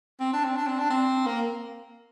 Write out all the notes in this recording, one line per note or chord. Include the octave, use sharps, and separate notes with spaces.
C4
D4
C4
D4
C4
D4
C4
A#3